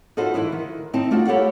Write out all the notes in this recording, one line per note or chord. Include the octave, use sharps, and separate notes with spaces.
D#4 F4 F#4 A4 B4 C5
E3 E4 B4 C5
D#3
C4 D#4 E4 C5 A5
A3 D4 F4 F#4
E4 G4 A4 C#5 F5 F#5